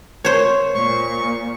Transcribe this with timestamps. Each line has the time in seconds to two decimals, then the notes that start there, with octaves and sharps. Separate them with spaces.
0.25 C5 C#5
0.74 A#2 C#6